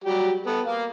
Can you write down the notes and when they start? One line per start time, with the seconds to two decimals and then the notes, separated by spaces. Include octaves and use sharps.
0.04 F#3 G3 G4
0.47 B3 A4
0.66 A#3 F5